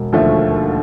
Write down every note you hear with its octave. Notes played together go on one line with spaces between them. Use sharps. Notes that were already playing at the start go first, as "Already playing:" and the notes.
Already playing: E1
D#2 D3 F3 A3